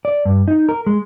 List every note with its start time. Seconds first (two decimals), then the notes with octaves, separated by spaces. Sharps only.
0.05 D5
0.25 G2
0.48 D#4
0.69 A#4
0.87 G#3